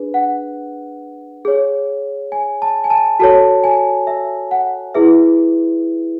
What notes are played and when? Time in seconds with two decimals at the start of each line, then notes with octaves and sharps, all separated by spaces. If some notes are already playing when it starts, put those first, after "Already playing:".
Already playing: D4 G#4 B4
0.14 F#5
1.45 G#4 C#5
2.32 G#5
2.62 A5
2.84 G#5
2.90 A5
3.19 F#4 A4 C#5 A5
3.64 G#5
4.07 E5
4.51 F#5
4.94 E4 G#4 B4 E5